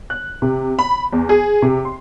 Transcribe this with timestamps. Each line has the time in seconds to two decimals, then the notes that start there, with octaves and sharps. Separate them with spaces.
0.10 F#6
0.42 C3
0.79 B5
1.13 E2
1.29 G#4
1.62 C3
1.85 C6